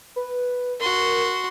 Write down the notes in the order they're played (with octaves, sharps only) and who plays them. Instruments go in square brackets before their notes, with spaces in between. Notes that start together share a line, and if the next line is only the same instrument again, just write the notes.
[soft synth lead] B4
[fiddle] F#4 C6 [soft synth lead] A#4